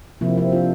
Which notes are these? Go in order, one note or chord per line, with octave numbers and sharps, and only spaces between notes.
C3 F3 A#3 C4 E4
C4 E4
D4 F4